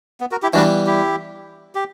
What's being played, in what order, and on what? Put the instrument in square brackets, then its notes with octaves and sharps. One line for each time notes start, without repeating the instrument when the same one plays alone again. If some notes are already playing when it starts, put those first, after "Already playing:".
[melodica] B3
F#4 A#4
E4 G4
[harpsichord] E3 G3 B3 [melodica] D4 F#4
[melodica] E4 G4
G4